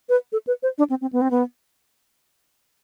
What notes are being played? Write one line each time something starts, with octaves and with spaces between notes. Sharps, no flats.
B4
A4
B4
C5
D4
C4
C4
B3
C4
B3